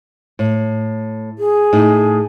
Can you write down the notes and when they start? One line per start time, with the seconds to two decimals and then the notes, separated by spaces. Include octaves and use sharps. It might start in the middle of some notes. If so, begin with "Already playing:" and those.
0.39 A2
1.39 G#4
1.73 A2 D#4